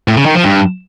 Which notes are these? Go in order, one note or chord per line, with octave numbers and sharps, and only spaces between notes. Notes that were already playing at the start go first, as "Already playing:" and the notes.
A2
C#3
D#3
F3
G2